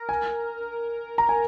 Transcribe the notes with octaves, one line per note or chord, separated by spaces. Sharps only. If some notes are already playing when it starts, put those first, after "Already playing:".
Already playing: A#4
G#5
A#5
G#5